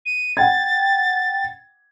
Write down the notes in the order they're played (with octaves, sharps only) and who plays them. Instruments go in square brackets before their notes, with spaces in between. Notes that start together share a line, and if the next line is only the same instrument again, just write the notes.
[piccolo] D#7
[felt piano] F#5 G5 G#6 [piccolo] A6